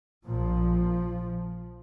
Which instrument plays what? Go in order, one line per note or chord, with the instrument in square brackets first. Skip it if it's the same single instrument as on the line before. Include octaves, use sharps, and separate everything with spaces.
[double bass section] A#1 A#2 F3